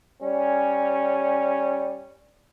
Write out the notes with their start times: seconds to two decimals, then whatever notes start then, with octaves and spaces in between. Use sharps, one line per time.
0.21 G3 C#4